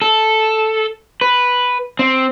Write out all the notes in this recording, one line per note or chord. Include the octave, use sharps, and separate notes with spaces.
A4
B4
C4